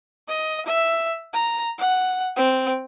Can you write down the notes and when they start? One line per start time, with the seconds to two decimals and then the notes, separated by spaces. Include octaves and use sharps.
0.29 D#5
0.66 E5
1.33 A#5
1.78 F#5
2.36 C4